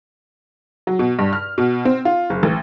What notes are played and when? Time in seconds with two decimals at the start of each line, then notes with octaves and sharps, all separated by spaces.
0.87 F#3
0.99 B2
1.19 G2
1.33 F6
1.58 B2
1.85 C4
2.05 F4
2.30 F#1
2.43 A1